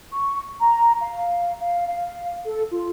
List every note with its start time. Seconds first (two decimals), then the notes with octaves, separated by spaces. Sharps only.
0.13 C#6
0.60 A#5
1.02 F5
1.59 F5
1.86 F5
2.44 A4
2.71 F4